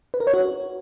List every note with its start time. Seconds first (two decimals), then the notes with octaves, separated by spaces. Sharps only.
0.14 B4
0.20 A#4
0.27 C#5
0.33 F#4